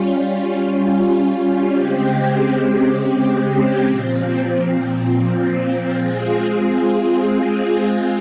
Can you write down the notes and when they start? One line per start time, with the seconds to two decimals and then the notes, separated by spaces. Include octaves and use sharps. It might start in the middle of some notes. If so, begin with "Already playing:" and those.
Already playing: G3 C#4 F4
1.72 C#3 G#3 C4 G4
3.83 A#2 F3 C4
5.94 G#3 C4 F4 G#4